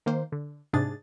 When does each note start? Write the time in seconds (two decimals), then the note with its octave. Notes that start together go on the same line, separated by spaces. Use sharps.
0.06 D#3 A#3 C5
0.32 D3
0.73 G#2 C3 D4 G#4 A6